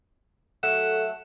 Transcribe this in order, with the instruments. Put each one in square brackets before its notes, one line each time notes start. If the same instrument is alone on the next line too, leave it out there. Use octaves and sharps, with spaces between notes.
[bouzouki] F#3 A3 E5 [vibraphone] A4 [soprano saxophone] F#5 [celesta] E7